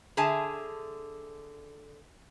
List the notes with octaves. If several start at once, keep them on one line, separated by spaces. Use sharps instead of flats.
D3 G#4 E5 G#5 A5